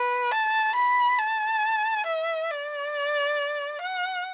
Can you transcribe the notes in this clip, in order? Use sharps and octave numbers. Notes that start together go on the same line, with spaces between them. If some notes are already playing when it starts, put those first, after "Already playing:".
Already playing: B4
A5
B5
A5
E5
D5
F#5